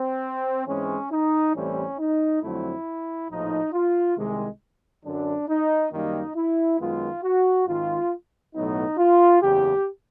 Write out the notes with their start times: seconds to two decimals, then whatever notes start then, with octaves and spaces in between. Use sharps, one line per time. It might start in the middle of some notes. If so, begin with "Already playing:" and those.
Already playing: C4
0.66 G#2 E3 G#3 C4 C#4
1.11 D#4
1.54 A1 A2 E3 G3 C4 C#4
1.98 D#4
2.41 F2 D3 F#3 A3 C4 E4
3.29 A#1 A2 F3 D#4
3.73 F4
4.17 C2 C3 D#3 G#3
5.04 F#2 D3 F#3 D4
5.48 D#4
5.91 F#2 D#3 G3 A#3 D#4
6.35 E4
6.79 F#2 D#3 G#3 B3 F4
7.23 F#4
7.67 G#1 G#2 D#3 F4
8.54 B1 A2 F#3 B3 D#4
8.97 F4
9.41 F#1 E2 C#3 G4